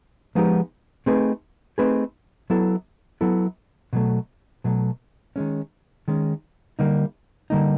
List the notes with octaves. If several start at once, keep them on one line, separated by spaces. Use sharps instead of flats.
F3 G#3 B3 D#4 G4
A3 C4 D#4 G#4 B4
A3 C4 D#4 G#4 B4
F#3 B3 E4 A4
F#3 B3 E4 A4
B2 F#3 A3
B2 F#3 A3
D#3 G#3 C#4
D#3 G#3 C#4
D3 G3 A#3 D#4
D3 G3 A#3 D#4